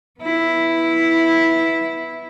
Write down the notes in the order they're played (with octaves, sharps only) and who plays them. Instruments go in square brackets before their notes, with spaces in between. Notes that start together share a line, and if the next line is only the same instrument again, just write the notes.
[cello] B3 E4